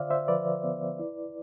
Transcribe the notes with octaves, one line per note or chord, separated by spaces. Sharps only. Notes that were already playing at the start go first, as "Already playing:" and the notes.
Already playing: D3 F4 C5 D5 E5 F5
C5 E5
F3 B4 D5
B3
E4